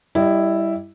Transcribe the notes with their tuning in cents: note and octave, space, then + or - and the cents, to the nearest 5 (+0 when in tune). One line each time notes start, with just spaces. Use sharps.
G3 +0 E4 +0 D#5 -30